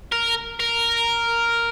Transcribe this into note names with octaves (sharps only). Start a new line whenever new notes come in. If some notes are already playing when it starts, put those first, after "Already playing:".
A#4
A#4